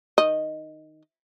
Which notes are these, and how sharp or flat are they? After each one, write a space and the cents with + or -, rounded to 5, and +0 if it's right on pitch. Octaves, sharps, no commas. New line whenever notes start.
D#3 -5 D#5 +0